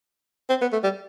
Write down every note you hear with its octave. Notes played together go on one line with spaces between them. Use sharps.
C4
B3
A3
G3